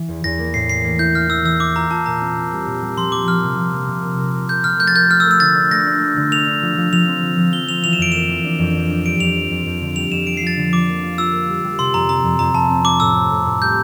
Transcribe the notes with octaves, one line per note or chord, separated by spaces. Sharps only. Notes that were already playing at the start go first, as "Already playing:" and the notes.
Already playing: E3
E2
E2 A#6
A#3
A2 C7
E3 C7
A#3
E4 G6
E3 F6
E4 E6
E3 E6
E4 D6
F4 A#5
F4 A5
A#2 A#5
C4
C4
G3
A#2
G3
F3 C6
A#3 D6
F3 F6
C3
F3
A#3
C3
A#3
A#4
A#4
A#4 G6
F3 F6
A3 G6
A6
A#4 G6
A#4 F6
E6
A3
E6
D3 A6
D4
A3 A#6
D4
A3
D3
A3 F7
D4
F3
F3
F3 F7
C4
F3
F3
F4 G7
C4 F7
E3 F7
E7
F2 D7
A#3 E7
E3
D4
F2
D4
D4
G3 D7
F2 F7
C4
F2
F2
D3
G3 F7
F2 E7
F3 D7
C7
F3 A6
D3
F3 D6
A#3
F4
F4 E6
A#3
G3
G3
C3 C6
F2 A#5
C4 A#5
F2
F2 A#5
F2 A5
C4
C4 D6
A2 E6
C4
A2
A2
G3 G6